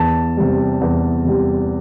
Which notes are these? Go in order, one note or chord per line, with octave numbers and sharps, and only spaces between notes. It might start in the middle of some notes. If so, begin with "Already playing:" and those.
Already playing: E2 A5
C3 G3
E2
C3 G3